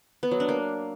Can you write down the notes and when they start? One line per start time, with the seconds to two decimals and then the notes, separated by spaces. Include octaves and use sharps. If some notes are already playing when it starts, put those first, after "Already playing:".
0.23 B3
0.31 F#3
0.40 D4
0.49 A#3